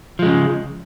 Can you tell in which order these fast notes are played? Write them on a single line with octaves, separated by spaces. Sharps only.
F3 G#3 C#3